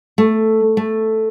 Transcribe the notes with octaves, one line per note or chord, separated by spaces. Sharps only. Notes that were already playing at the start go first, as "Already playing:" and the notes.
A3
A3